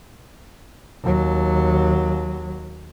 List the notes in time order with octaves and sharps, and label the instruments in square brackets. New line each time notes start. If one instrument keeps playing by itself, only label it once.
[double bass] D#2 F#3